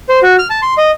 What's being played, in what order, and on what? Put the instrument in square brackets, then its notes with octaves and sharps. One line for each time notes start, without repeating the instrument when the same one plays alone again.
[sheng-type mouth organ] C5
F#4
F6
A5
C6
D#5